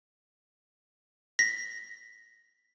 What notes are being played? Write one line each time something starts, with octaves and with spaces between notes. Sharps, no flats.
A#6 B6